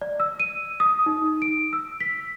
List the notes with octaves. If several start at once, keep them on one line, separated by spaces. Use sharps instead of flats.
D5
E6
D#7
D#6
D#4
D7
E6
B6